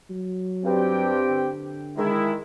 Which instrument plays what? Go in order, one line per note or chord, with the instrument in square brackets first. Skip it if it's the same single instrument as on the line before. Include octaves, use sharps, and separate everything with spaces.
[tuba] F#3
[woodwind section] G2 [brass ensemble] C4 G4 G5
[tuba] D3
[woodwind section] D#3 [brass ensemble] G#3 E4